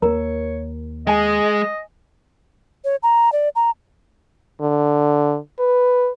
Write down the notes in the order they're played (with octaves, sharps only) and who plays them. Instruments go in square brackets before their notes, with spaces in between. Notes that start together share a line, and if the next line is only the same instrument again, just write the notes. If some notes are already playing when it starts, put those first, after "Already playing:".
[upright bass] D#2 [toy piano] A#4 A#5 [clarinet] C#5
[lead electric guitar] G#3 [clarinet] D#5 [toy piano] G5 G#5
[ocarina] C#5
A#5
D5
A#5
[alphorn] D3
B4